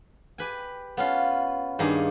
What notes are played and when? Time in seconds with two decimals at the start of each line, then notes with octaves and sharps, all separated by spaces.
0.38 G4 B4 G#5
0.97 B3 C#4 F4
1.79 G2 D#3 A#3 D#4 G#4